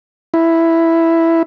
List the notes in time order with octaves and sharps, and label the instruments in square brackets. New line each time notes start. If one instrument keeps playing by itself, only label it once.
[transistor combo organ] E4